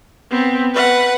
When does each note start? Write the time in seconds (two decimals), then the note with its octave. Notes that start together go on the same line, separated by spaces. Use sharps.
0.30 B3 C4
0.74 B4 F#5